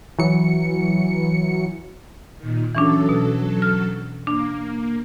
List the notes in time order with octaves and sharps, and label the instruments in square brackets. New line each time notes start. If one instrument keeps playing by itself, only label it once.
[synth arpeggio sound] E3 F#3 C#7
[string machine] A#2 D#3
[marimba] E3 C#4 D4 [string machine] F#3 A4
[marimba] B2
F6
[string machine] A#3 [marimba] D4